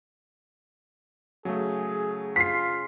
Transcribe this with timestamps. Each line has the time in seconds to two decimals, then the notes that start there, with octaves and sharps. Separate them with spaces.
1.45 C#3 F#3 A3 G#4
2.36 F4 B6 C7